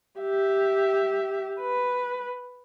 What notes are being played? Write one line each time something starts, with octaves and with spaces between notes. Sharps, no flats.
G4 E5
B4